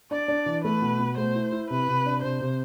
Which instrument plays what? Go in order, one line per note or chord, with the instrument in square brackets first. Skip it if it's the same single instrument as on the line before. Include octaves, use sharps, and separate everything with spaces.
[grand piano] D4 [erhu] D5
[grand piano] D4
E3
[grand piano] A3 [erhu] B4
[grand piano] B2
B2
[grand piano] A3 [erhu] C5
[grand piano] E4
E4
[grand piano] C3 [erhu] B4
[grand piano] C3
D4
[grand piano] C3 [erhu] C5
[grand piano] C3